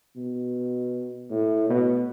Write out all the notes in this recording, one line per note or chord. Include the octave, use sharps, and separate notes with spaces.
B2
A2
B2